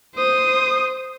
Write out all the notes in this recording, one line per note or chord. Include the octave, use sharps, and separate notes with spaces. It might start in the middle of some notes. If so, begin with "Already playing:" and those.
C5 D#6